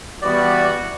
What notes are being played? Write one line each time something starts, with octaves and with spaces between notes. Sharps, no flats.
E3 G3 B3 F#4 D5